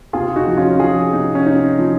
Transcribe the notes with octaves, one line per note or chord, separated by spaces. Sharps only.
C3 F4 G#4
D#4 F#4
F3
C#4 F4
F3 F4 G#4
C3 D#4
C#4
C3 D#4
F3